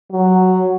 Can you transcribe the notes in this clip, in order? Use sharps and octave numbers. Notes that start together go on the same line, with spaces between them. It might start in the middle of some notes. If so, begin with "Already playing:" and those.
F#3